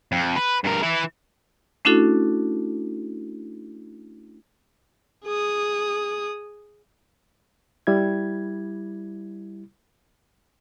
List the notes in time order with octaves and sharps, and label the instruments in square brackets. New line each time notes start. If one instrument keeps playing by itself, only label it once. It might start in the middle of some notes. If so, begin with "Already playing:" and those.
[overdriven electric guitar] F2
B4
G2 A#4
E3 E4
[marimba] A3 C#4 D4 E4 F#4 A4
[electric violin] G#4 D#6
[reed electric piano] G3 E4 G#6